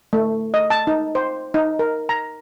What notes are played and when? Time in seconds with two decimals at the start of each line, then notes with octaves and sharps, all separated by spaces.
0.13 A3
0.54 D#5
0.70 A5
0.87 D#4
1.15 C5
1.54 D#4
1.79 A#4
2.09 A#5